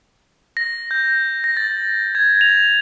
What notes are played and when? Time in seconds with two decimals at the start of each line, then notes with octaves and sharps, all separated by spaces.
0.57 A#6
0.91 G6
1.44 A#6
1.57 A6
2.15 G#6
2.41 F7